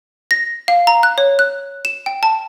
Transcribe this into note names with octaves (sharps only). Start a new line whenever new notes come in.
A#6
F5
A#5
F#6
C#5
F#6
E7
G5
A5